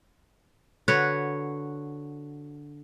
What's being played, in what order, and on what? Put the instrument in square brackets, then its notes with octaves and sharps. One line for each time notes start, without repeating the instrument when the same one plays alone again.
[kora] D3 F#4 B4 C#5